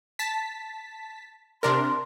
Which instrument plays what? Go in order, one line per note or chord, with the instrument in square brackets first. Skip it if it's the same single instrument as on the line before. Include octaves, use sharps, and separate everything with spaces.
[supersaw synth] A5 B6
[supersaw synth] C3 D4 A#4 [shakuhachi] C6